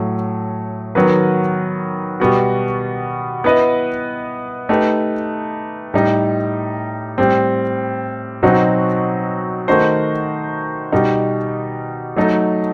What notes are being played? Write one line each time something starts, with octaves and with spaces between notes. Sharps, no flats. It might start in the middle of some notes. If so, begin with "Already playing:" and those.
Already playing: A2 F#3 A3
D#3 F#3 B3 F#4 B4
B2 G3 B3 F#4
B3 E4 B4 D#5
A3 D#4 G4 B4
A2 G3 D#4
A2 G3 C4
B2 F#3 C4 D#4 F#4
D#3 A3 D#4 F#4 C5
B2 G3 D#4
F#3 A3 D#4 A4